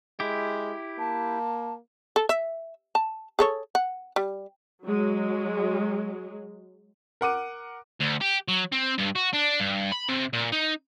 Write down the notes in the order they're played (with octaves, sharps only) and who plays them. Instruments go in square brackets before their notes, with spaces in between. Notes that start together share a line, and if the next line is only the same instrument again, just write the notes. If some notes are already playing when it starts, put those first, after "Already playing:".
[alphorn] G#3 [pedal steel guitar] E4 G4
[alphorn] A#3 [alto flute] A5
[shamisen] A4
E5
A5
G#4 A4 C#5
F#5
G3
[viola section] F#3 G#3
[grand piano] A#4 F#5 D6 D#7
[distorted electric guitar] D2
G4
F#3
C4
G2
F#4
D4
G2
B5
C3
A#2
D#4